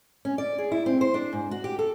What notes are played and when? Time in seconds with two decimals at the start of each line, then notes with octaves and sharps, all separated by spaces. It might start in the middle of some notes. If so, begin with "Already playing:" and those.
0.25 C#4
0.38 D5
0.58 G#4
0.72 E4
0.86 C4
1.01 C5
1.14 D4
1.33 G#2
1.51 F#4
1.64 G4
1.79 A4